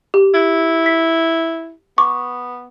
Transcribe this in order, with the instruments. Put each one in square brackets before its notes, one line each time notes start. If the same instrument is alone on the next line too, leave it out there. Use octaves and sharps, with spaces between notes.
[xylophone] G4
[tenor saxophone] E4
[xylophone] B6
[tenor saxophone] B3 [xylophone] C#6 D6